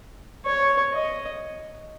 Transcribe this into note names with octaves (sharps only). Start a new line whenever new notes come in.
C#5
D#5